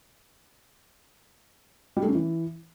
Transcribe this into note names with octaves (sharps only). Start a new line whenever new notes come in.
G3
A3
C#4
E3